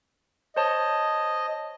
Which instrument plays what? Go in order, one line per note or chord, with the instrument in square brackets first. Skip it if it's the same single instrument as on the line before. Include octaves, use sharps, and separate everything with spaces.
[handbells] C5 C#5 A5 [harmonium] D#5